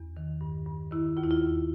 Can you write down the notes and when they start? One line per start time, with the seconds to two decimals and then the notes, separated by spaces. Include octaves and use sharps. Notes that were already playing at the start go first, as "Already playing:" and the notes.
Already playing: E2
0.17 D#3
0.41 G2
0.66 G2
0.91 D#3 E4
1.17 D#2 F4
1.24 E4
1.31 F4
1.42 D#2